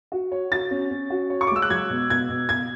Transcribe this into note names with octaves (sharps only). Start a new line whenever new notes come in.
F#4
C#5
F#4 A6
C#4
C#4
F#4
C#5
C#6
D6
G#3 E6
F#6
F#3 G#6
B2
B2 G#6
B2
B2 G#6